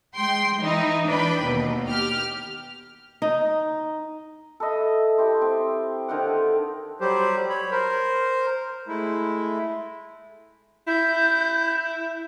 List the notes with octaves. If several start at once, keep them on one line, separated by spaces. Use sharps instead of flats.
G#3 G5 C6
E3 D#4 E4
E3 D4 B4 G5 B5
D#2 B2
G4 F6
D#4
A4 B4 D#5 E5
E4 G4 C5
C4
D3 D#3 C4 F#5
F#3 G3 G4 C5
C#5 B5
A#4 C5
G#3 A3 E4
E4 G6